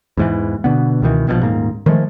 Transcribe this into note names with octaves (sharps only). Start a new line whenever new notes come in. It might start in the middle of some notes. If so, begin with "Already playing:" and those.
E2 G#2 E3
B2 D3 B3
C#2 B2 D#3 E3
A#1 B2 D3 F3
D#1 G#2 A#3
D#3 F3 G#3 A3